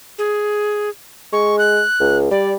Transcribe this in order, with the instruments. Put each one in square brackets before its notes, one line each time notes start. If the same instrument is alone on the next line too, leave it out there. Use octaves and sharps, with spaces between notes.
[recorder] G#4
[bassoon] G#3 [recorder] C#6
[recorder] F#6
[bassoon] C#2
[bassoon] G3 [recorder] D5